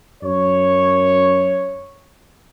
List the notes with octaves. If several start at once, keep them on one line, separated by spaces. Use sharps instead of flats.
F#2 C#5